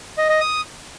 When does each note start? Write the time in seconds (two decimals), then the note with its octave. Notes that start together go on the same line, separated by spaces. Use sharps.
0.18 D#5
0.29 D#5
0.40 D#6